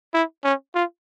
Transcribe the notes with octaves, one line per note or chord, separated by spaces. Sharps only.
E4
C#4
F4